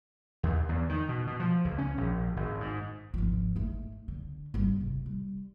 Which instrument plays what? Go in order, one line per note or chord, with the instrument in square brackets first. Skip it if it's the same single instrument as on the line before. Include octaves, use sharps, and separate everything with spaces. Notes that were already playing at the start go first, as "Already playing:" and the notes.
[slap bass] D#2
E2
D#3
B2
B2
F3
C#2
C#4
A#1
G#1
G#2
[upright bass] G#1 F3
G#2 A3
D3
G#1 G3
C3
G3